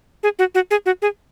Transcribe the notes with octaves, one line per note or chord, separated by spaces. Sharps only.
G#4
F#4
F#4
G#4
F#4
G#4